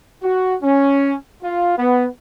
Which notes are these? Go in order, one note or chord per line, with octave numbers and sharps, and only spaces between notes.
F#4
C#4
F4
B3